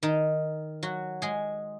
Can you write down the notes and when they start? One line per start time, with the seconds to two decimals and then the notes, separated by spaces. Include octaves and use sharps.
0.03 D#3 D#4
0.83 F#3 F#4
1.22 G#3 G#4